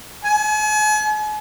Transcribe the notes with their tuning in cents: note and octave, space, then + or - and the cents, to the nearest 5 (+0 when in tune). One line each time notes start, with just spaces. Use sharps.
G#5 +40